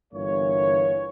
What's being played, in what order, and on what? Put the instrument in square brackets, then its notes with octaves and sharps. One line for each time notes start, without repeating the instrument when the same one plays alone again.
[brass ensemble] G1 G2 E3 A#3 C#5